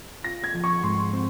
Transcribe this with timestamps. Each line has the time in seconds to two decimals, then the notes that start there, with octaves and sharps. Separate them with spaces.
0.24 F4 A#6
0.44 G#6
0.54 F3
0.64 C#6
0.83 G#2 C6
1.13 C4